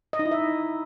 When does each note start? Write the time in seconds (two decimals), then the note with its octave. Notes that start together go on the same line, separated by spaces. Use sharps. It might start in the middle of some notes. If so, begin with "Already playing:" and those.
0.13 D#5
0.19 D#4
0.25 E4
0.31 E5